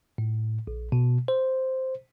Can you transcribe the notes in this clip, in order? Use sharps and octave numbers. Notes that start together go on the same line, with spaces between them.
A2
A#1
B2
C5